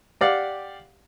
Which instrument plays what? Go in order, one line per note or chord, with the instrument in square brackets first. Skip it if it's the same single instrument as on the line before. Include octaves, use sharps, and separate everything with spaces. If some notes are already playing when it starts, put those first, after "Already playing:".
[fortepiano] G4 D5 F5 F#5